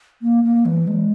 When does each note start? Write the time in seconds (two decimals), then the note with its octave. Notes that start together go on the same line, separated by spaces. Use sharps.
0.22 A#3
0.44 A#3
0.65 E3
0.87 G#3